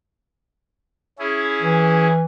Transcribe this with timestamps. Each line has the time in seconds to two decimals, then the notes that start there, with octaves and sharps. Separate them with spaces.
1.19 C#4 E4 G#4
1.62 E3